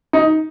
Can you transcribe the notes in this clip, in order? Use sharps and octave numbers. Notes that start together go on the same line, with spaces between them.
D#4